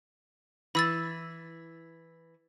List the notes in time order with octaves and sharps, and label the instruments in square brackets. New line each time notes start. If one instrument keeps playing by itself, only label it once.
[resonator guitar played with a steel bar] E3 [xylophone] B5 E6 A6